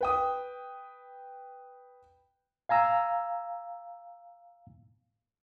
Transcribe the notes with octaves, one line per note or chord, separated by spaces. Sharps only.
B4 G5 D#6
F5 G#5 A#5 E6